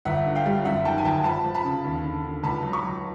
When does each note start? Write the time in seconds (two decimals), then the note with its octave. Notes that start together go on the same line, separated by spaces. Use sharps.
0.05 G1 E5 F#5
0.26 D3
0.35 F5 G5
0.46 G3
0.65 F#2 E5 F#5
0.85 D#3 G5 A5
0.98 G#5
1.05 G1 G5 A5
1.24 F3 A5 B5
1.45 F3
1.54 A5 B5
1.64 C#3
1.85 D#2
2.04 D3
2.24 D3
2.43 C#2 A5 B5
2.63 F#3
2.73 B5 C#6
2.83 F#3